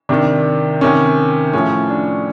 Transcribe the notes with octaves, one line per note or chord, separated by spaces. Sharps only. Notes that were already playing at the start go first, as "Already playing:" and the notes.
C3 D#3 D4
C3 D#3 C#4
A2 F3 C#4
D4